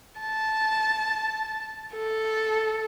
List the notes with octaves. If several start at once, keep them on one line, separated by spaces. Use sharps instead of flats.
A5
A4